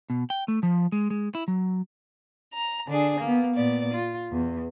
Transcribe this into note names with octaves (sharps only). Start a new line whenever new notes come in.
B2
G5
A3
F3
G#3
G#3
E4
F#3
A#5
D3 D4 G#4
A#3 B3
A#2 B3 D5
F4
E2